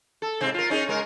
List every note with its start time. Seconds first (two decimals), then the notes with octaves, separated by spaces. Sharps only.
0.22 A4
0.41 G#2 C3 C4
0.54 F4 A#4
0.70 C#4 D#4 G#4
0.88 C#3 G#3 A#4